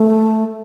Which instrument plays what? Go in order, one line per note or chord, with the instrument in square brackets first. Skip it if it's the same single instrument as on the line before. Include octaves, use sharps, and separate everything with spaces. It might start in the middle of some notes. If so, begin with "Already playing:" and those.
Already playing: [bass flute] A3